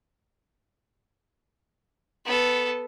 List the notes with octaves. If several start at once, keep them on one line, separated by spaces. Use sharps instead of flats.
B3 A4